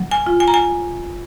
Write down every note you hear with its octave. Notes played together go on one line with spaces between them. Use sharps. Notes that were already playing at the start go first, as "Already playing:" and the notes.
Already playing: F#3
G#5
F4
G#5
A#5
G#5